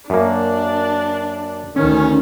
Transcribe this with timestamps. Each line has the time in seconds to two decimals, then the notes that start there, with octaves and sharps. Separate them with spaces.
0.10 F#2 A#3 D4
1.76 D2 D#3 C#4